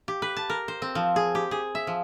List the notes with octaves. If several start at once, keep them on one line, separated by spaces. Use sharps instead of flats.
G4
B4
A5
A#4
C5
C4
F3
G#4
G4
G#4
E5
F3